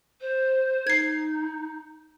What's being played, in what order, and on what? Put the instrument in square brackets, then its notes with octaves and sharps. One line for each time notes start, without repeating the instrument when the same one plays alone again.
[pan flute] C5
[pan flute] D#4 [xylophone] G#6 C7